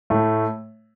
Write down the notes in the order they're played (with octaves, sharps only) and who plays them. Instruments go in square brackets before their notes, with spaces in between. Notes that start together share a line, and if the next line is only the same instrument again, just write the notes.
[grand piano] A2 A3